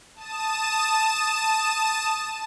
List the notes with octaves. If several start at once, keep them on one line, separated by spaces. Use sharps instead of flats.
A5 D#6 E7